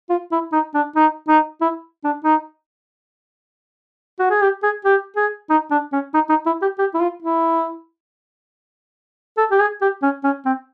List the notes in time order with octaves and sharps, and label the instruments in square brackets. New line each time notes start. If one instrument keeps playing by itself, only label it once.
[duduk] F4
E4
D#4
D4
D#4
D#4
E4
D4
D#4
F#4
G#4
G4
G#4
G4
G#4
D#4
D4
C#4
D#4
D#4
E4
G4
G4
E4
F4
E4
A4
G4
G#4
G4
C#4
C#4
C4